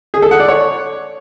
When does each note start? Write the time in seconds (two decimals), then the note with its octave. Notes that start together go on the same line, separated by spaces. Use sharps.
0.14 G#4
0.22 A4
0.31 F#5
0.40 D5
0.48 C#5